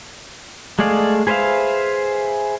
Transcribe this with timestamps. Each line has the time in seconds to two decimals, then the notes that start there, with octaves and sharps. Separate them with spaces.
0.79 G#3 A3 G#4 D5 F5
1.27 G#4 B4 C5 E5 F5